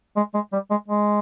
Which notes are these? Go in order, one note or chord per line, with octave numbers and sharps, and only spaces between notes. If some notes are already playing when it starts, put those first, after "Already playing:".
G#3
G#3
G3
G#3
G#3